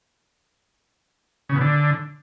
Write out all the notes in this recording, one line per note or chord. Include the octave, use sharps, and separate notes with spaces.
C#3
B2
D3